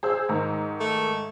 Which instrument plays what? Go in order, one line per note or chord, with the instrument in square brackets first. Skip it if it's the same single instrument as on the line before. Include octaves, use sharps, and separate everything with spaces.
[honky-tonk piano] G#4 C5 E6
G#2 D#3 A#5
[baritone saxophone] A3